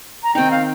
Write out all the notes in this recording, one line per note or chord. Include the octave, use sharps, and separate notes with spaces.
A#5
D#3 C4 D#4 G5
F5